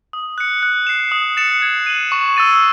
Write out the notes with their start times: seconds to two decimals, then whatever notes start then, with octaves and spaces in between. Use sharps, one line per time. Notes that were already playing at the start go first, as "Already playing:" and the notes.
0.13 D#6
0.38 F#6 C#7
0.63 F#6
0.87 C7 E7
1.12 D#6
1.37 A6 C#7 E7
1.62 G#6
1.86 D#7 F#7
2.12 C#6
2.36 E6 A6 D#7